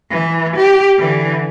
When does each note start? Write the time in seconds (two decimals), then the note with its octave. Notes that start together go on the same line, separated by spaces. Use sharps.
0.11 E3
0.56 G4
0.98 D3 E3